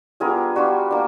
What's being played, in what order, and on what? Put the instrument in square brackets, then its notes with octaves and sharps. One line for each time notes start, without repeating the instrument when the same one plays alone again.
[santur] G3 B3 D4 F4 G#4 A#4
G3 B3 D4 F4 F#4
A#3 D4